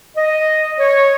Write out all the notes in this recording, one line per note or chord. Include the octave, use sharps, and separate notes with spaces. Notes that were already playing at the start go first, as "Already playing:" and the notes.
D#5
C#5